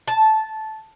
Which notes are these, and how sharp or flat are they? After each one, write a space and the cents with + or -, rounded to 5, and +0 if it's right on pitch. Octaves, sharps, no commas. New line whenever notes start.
A5 -10